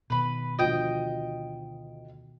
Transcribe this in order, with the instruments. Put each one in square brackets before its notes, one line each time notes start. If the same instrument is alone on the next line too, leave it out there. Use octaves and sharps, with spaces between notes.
[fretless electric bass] B2 D#3 [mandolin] B4 B5
[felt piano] D2 F3 [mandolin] D#5 G5